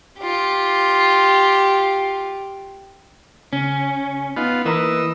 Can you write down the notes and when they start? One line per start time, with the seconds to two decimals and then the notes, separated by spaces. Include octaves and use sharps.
0.20 F4 G4
3.53 C#3 C#4
4.37 B3 D#4 F4
4.66 E3 A#3 D#5 A#5 B5 E6